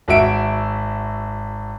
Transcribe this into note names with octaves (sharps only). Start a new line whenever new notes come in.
G#1 F#4 E5 D7